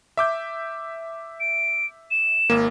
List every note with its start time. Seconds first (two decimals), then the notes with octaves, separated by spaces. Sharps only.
0.17 E5 D6 G6
1.40 D7
2.11 E7
2.50 G#1 A#3